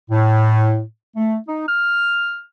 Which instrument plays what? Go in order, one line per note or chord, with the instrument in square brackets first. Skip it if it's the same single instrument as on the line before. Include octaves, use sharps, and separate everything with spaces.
[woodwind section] A2
A3
D#4
F6